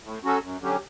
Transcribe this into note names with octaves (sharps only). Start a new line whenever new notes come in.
A2
F#3 C#4 F#4 A4
F#2
D3 F#3 C#4 G4